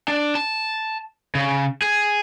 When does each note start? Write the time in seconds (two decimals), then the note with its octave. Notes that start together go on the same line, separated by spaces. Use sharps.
0.08 D4
0.35 A5
1.35 C#3
1.82 G#4